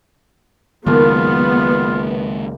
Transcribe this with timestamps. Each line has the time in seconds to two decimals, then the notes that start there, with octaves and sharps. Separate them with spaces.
0.87 F#1 C#2 D#3 G#3 A#3 B3 F4